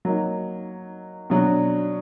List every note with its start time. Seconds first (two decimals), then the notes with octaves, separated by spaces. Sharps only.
0.05 F#3 A#3 D#4
1.30 B2 F#3 D4 F#4